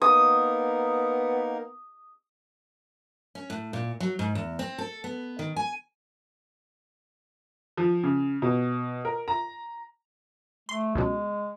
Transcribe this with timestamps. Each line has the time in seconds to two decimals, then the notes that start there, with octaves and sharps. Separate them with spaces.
0.02 A#3 B3 D#4 A#4 D#6
3.35 C#4
3.50 A2
3.73 A#2
4.00 F#3
4.19 G#2
4.35 E2
4.59 C4
4.78 A4
5.04 B3
5.39 D#3
5.56 G#5
7.77 F3
8.03 C#3
8.42 B2
9.05 A#4
9.28 A#5
10.69 A3 C6
10.95 C#2 B2 F#3 G#3